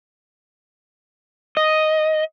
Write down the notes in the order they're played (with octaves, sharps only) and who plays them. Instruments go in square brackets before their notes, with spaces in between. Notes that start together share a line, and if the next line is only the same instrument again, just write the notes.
[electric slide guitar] D#5